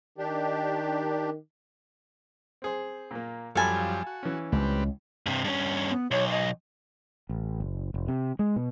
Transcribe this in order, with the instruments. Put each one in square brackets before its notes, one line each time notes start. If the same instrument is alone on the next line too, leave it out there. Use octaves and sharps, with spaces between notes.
[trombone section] D#3 [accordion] D4 G4
[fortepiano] C4 G#4 C5
A#2 A#3
[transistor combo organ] F#2 F3 G3 [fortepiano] A4 A5 B5 [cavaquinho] F5 G#5
[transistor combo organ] F#4
[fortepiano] E3 C#4
[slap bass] C#2 [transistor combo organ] G3 C4 B4
[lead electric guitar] G2 C3
G2 C#4
[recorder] B3
[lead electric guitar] B1 [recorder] C#5
[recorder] D#5
[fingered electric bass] A1
F#1
F1
C3
G#3
B2